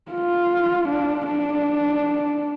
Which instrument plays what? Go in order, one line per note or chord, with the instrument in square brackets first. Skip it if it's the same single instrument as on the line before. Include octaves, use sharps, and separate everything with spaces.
[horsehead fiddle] F4
D4
D4